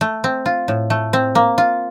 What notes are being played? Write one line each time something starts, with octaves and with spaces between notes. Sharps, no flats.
A3
C4
F4
A2
A3
C4
A#3
F4